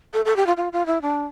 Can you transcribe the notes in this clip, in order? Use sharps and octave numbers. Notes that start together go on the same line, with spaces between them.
A4
A4
G4
F4
F4
F4
E4
D4